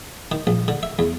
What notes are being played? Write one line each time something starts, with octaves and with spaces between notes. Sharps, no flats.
D#3
A#1
D3
E5
E2